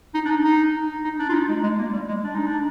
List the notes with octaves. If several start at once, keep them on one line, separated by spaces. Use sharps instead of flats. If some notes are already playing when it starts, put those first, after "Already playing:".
D#4
D4
D#4
D#4
D#4
D4
F4
D#4
G#3
G#3
A#3
G3
G#3
D4
D#4
D4